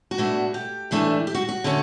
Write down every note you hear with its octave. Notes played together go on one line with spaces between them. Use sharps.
F#4
B2 A3 D4
G4
F#2 E3 A3 D4
G4
F#4
F#4
D3 A3 C#4